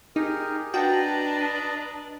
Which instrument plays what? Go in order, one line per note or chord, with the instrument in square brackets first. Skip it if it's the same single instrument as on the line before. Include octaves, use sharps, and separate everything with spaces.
[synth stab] D#4 [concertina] G4 G#4 A#4
[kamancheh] D4 B4 [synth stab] F#4 G5 [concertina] D#5 A5 A#5